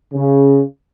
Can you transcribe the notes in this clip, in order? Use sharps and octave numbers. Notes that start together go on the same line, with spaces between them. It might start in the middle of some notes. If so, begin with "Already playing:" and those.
C#3